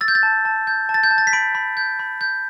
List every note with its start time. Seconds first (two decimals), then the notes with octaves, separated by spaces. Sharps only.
0.01 E6 A6
0.08 G6
0.15 A6
0.23 A5
0.45 A5
0.67 G6
0.89 A5
0.94 A6
1.03 G6
1.11 A5
1.18 A6
1.27 B6
1.33 B5 D7
1.55 B5
1.77 G6
1.99 B5
2.21 G6